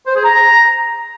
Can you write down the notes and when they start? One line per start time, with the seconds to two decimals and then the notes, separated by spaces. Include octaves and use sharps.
0.07 C5
0.15 G#4
0.24 A#5